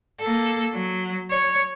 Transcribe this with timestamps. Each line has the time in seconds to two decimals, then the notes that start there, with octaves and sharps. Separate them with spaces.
0.21 A#3 A4
0.75 F#3
1.31 C#5